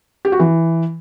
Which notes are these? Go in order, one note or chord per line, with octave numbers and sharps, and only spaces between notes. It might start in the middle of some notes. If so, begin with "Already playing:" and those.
G4
F#4
E3